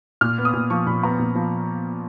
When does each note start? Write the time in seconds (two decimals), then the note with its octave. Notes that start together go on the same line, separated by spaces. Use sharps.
0.21 A#2 F6
0.38 B3
0.45 D#6
0.53 A#2
0.70 F3 C#6
0.86 A#2 B5
1.03 B3 A#5
1.19 A#2
1.35 F3